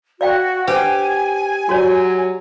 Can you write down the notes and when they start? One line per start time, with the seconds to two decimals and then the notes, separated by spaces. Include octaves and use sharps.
0.21 F#4 D5 F5 G5
0.68 G4 B4 C5 F#5 G#5
1.69 F#3 F#4 C#5 D5